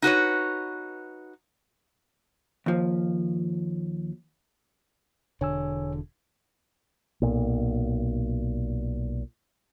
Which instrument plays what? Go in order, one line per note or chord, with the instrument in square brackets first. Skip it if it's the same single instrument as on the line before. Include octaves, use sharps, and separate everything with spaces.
[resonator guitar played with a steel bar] D#4 F#4 B4 C#5
[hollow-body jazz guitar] D#2 F3
[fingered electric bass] E1 D3 [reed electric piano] C#5 G#5 E6
[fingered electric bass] B1 A#2